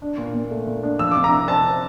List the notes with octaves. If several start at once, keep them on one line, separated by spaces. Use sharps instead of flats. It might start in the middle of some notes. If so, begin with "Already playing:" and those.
D4
A#2
A#2
A3
A#2
D4
F3 E6
C3 D6
A#5
C3
C4 A5
C4